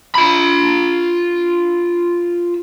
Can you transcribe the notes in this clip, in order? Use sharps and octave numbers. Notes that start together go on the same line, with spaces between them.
F4 B5